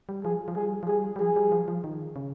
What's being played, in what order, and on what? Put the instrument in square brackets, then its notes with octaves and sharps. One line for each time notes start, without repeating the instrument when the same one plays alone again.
[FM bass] G3
[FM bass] F3 [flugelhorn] G#4
[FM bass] F3
[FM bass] G3 [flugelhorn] G#4
[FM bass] F3
[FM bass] G3 [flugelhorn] G#4
[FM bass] G3
[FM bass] F3 [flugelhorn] G#4
[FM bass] G3
F3
F3
D#3
C#3